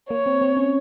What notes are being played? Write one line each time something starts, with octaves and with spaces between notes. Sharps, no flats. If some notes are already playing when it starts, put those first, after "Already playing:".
A#3 C#5
C4
C4
C#4